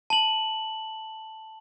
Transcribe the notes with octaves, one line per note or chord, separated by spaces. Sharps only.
A5 F#7